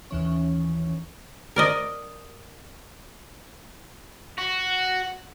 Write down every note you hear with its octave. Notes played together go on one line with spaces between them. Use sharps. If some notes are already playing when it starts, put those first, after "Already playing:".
D#2 E3 C#4
A#4 D5 D#5
F#4